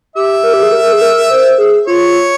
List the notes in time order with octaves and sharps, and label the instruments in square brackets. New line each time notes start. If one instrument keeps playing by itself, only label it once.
[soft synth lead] G4 [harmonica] E5
[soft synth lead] A#4
G4
G#4
A#4
G#4
A#4
C5
G#4
[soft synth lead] F4 [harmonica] C#5